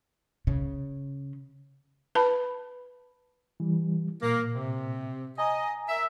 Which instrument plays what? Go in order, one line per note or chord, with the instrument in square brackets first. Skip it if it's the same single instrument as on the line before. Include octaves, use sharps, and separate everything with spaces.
[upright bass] C#3
[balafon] B4 A5 B5
[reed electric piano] E3 G3
[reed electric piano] A#2 [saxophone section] A#3
[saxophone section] C3
[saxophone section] D#5 [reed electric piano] G#5 A#5
[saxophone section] A#4 E5